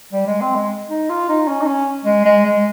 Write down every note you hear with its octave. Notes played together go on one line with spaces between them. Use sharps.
G3
G#3
C4
G#3
D#4
F4
D#4
C#4
D#4
C#4
G#3
G#3
G#3